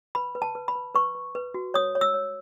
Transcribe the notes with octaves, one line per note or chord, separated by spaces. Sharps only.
B4 B5
B4
A5
B4
B5
B4
B4 C#6
B4
B4
F#4
C#5 D#6
C#5
E6
C#5